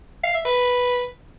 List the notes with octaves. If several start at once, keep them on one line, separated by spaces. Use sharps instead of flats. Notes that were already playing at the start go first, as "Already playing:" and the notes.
F5
E5
B4